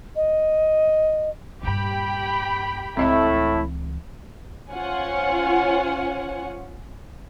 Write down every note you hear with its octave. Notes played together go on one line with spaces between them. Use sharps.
D#5
G2 A#2 G4 G5 B5
C#2 A2 E3 A3 C4 E4 D#5 E5
C#4 F4 C5 C#5 F#5 G#5